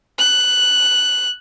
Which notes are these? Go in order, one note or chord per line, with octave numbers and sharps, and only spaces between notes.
F#6